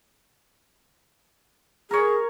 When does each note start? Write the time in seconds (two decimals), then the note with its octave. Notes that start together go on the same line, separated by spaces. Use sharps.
1.91 G#4 A#4 C#5